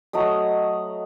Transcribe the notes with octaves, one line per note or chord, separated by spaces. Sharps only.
F#3 A3 D#5 D#6